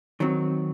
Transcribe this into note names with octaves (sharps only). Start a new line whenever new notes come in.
D#3 F#3 C4